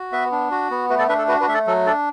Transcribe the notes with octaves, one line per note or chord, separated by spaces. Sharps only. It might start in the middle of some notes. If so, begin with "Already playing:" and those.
Already playing: F#4
B3 B4 E5
D4
F#4
B3
A3 F#4 B4
A4 D5
D4 B4 E5
A4
F#4 B4
F#4 B4
A3 E5
A4 D5
F#3 A4
D4 A4 D5